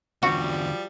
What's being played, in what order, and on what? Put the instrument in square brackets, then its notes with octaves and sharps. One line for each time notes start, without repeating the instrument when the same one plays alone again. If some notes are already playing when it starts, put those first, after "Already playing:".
[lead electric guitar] E2 D3 [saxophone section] F3 G3 [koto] F#4